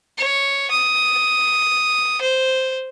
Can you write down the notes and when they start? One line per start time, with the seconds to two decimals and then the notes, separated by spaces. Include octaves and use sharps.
0.18 C#5
0.71 D#6
2.21 C5